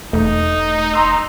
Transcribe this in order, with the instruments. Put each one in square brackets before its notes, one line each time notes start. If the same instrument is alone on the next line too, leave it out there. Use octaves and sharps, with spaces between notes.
[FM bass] E1 [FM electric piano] A3 [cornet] D#4
[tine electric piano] A#5 C6 E6